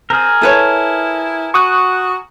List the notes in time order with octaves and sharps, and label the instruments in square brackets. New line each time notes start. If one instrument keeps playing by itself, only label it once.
[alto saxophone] C4 [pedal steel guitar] G#4 A#4
[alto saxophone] E4 [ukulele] A4 B4 C#5
[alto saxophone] F#4 [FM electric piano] C#6 D#6 F#6